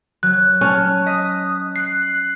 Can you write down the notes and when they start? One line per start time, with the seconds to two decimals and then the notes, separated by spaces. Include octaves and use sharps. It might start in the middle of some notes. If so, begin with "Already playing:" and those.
0.23 F#3 F#6
0.61 C#4 A5 F6
1.06 D#5 D#6 B6 D#7
1.76 F#6 C7